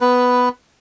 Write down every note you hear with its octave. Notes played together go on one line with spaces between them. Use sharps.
B3 B4